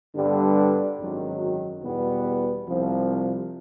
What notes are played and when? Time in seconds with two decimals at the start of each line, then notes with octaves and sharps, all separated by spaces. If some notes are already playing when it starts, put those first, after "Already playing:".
0.14 G2 D3 G3 B3 D4
0.99 G#1 F#2 D#3 F#3
1.83 E2 B2 G3 B3
2.68 C2 C3 F3